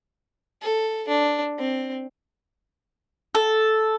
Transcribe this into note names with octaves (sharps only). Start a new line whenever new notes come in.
A4
D4
C4
A4